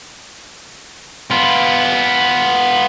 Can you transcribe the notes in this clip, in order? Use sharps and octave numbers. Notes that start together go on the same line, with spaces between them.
B3 F4